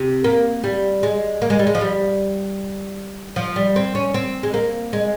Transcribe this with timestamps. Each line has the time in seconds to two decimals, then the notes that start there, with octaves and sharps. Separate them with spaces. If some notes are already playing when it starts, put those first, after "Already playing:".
Already playing: C3
0.24 A#3
0.64 G3
1.03 G#3
1.42 A#3
1.50 G#3
1.59 G3
1.67 G#3
1.75 F3
1.81 G3
3.36 F3
3.56 G3
3.76 C4
3.95 C#4
4.14 C4
4.43 G#3
4.54 A#3
4.93 G#3